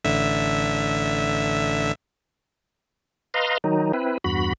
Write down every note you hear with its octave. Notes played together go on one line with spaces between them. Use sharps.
A1 D3 E5
B4 D#5 F5 A#5 C6
D#3 F#3 D#4
C4 E4 B4
E2 G2 F#4 B5